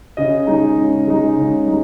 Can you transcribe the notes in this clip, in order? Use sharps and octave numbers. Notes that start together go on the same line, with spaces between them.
C#3 D#5
G#3 D#4
C#3
G#3 D#4
C#3
G#3 D#4